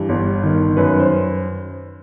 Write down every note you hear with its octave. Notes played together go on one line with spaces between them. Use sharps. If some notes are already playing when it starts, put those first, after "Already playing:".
Already playing: G2 E3
G1
D#3
F#2 B4
C5